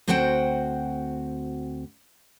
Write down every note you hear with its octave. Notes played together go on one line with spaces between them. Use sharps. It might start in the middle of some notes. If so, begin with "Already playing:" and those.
D2 C4 F#4 C5 F#5 G5